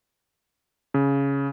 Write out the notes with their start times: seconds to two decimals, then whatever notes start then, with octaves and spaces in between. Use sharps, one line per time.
0.94 C#3